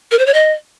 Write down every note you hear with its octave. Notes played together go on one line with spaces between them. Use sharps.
A#4
C5
C#5
D#5